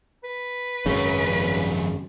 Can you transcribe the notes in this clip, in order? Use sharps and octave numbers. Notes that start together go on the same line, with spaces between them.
B4
G#1 F#2 C#3 F#3 A#4 C#5
F3 G3 C#4